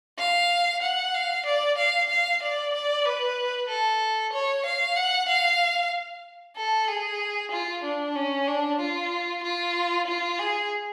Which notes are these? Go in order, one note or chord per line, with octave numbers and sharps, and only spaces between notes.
F5
F#5
F5
D5
F5
F5
D5
D5
B4
A4
C#5
F5
F#5
F5
A4
G#4
F4
D4
C#4
D4
F4
F4
F4
G#4